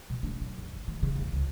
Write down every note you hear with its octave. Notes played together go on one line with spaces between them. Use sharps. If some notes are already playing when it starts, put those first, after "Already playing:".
B2
D4
F#3
F#2
G1
D#3
C#3
E2
C#2